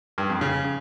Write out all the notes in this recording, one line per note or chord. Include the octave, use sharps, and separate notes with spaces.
G2
F2
C#3